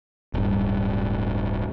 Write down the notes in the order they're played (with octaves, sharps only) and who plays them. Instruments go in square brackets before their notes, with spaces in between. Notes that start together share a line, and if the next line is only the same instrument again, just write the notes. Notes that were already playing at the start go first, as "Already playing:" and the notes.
[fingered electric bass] D1 G2